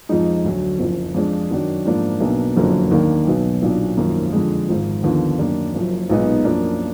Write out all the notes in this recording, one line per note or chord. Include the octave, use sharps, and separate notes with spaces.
F2 F3 G#3 D#4
D2 D3 F#3
F#1 F2 F3
F2 F3 G#3 D4
F#2 D#3 F#3 D4
G#2 F3 A#3 D4
B1 B2 A#3 D4
F#1 F2 D3 F#3 A#3
D#2 D#3 A#3 D4
B1 B2 F#3
B1 A#2 F#3 D4
G#1 F#2 F3 A#3
F2 D3 G#3
G#1 G#2 F3
D#2 D3 F3 B3
F#2 D#3 A#3 D4
F#1 F#2 F3
B1 A#2 G#3 B3 D#4
F#2 F3 A#3 D4